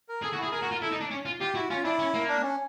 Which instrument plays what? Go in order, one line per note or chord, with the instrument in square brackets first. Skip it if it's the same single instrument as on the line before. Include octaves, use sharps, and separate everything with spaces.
[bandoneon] A#4
[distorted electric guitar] G#4 [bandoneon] A4
[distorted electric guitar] F#4
[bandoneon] E4 [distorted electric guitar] G#4
[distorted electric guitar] G#4 [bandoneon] A#4
[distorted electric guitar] F#4
F4
[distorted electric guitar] E4 [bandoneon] A4
[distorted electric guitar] D#4
D4
C#4
F4
[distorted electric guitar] F4 [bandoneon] G4
[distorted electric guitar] E4 [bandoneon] F#4
[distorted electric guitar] C#4 [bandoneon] F4
[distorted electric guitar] D4 [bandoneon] E4
[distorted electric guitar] C#4
A#3
[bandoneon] D4
C#4